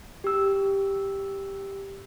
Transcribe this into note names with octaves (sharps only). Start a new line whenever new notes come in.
G4 E6